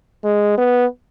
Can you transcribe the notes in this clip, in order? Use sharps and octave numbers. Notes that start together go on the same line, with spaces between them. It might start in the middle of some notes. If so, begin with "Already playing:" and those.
G#3
B3